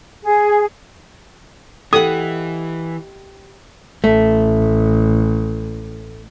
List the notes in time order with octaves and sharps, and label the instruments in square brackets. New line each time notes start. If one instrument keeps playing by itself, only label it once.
[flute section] G#4
[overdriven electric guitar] E3 [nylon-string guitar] G4 D#5 F#5 [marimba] A4 [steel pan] D#6
[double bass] A1 [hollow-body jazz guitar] A3